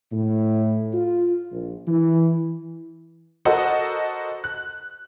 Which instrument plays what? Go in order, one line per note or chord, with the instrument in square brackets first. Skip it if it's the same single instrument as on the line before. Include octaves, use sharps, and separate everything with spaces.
[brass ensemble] A2
F4
A#1
E3
[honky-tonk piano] F#4 A4 A#4 C5 D#5 F#5
F#6